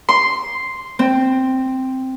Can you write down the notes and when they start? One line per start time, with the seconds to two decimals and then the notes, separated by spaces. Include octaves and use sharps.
0.09 C6
0.99 C4